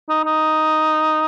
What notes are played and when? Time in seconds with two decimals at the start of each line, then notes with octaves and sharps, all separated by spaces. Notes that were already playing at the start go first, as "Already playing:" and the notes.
0.09 D#4
0.25 D#4